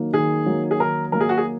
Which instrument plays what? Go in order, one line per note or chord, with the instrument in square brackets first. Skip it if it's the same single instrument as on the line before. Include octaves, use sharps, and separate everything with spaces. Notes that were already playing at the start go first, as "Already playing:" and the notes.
Already playing: [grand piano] D#3 F#3 A#3
[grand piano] D#3 [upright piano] G#4
[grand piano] F#3 A#3
[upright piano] G#4
[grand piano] D#3 [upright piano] A#4
[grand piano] F#3 A#3 [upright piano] A#4
[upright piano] G#4
F#4
G#4